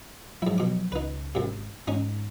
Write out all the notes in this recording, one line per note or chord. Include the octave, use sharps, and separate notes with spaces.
G#2 F3 F#3 E4
B2 D6
C#2 D#4 B4
G#1 F#2 C3
G#2 C#4 D#4